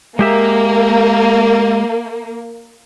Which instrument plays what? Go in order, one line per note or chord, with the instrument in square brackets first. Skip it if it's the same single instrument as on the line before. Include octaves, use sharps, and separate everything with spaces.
[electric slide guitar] G#3 G4 E5 [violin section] A#3